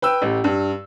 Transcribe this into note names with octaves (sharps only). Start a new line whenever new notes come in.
B4 G5 E6
A1 G4
G2